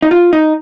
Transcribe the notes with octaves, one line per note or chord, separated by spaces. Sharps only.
D#4
F4
D#4